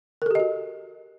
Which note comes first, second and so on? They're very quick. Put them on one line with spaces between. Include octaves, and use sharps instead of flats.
A#4 A4 G4 D#5 F#4